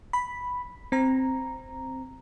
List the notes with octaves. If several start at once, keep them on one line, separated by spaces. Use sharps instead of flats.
B5
C4 A#5